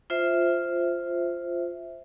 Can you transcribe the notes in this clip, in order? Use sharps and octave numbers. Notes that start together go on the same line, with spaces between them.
F4 C5 E5